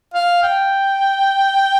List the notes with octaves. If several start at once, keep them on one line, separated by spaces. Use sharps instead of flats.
F5
G5